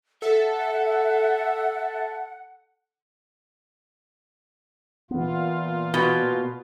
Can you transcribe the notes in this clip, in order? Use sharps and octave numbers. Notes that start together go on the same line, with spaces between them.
A4 E5 F#5
A#2 E3 B3 F4
B2